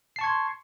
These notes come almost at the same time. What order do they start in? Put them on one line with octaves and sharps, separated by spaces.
C7 A5 C#6 G#6 C6